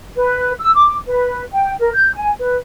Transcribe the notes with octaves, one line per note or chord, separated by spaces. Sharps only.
B4
E6
D6
B4
G5
A#4
G6
G#5
B4